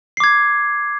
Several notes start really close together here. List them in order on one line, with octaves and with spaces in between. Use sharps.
C7 D6 G#6